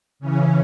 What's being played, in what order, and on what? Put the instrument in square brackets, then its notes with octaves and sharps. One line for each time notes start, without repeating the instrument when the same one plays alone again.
[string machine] C#3 E3 C#4